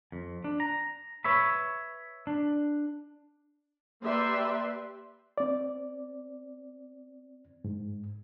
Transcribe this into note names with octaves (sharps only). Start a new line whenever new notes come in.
F2
D4
A#5
B4 C#5 E5 B5
D4
A#3 G4 B4 D5 E5 C6
C4 D5
G#2